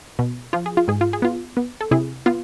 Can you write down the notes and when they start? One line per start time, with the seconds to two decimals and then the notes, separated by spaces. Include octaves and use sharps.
0.19 B2
0.53 F3 F4
0.66 G#4
0.77 F4
0.88 G#2 G#4
1.01 F4
1.13 G#4
1.22 B3 F4
1.57 B3
1.81 A4
1.91 C3 E4 G#4
2.26 B3 F4